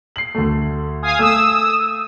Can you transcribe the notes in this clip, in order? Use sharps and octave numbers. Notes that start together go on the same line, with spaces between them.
C7 F#7
D2 A3
F5 G#5 D#6
A3 D#6 E6